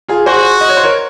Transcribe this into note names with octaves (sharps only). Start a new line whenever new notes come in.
F4 G#4
F#4 G#4 C5
D#5
C#5
C5
A#4 C#5